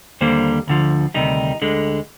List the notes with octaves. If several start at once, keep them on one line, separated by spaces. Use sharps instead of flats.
D#2 D3 G3 A#3 C5
D2 D3 F3
D2 C3 D#3 G3 D#4
D2 D3 G#3